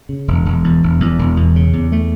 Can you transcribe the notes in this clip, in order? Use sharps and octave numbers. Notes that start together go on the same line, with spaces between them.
C#3
E1
E1
E2
E1
E2
E1
E2
C#3
E2
A3